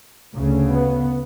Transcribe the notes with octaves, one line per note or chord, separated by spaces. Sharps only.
D2 C#3
B3